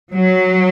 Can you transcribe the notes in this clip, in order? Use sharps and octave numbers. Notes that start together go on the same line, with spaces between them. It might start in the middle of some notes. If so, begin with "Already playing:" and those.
F#3